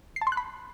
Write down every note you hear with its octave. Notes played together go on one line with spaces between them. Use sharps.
C7
A5
C6
F#6
B5